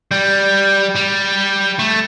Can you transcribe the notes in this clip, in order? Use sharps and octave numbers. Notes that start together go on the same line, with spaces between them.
G3
G3
A3